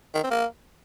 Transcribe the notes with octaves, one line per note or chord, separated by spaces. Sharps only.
D#3
C4
A#3